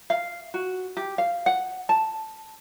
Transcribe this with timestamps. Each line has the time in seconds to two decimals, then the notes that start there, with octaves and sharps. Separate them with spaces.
0.10 F5
0.54 F#4
0.97 G4
1.18 F5
1.46 F#5
1.89 A5